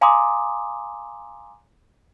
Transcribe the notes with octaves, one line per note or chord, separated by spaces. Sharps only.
F5 G#5 A#5 C6 D6 D#6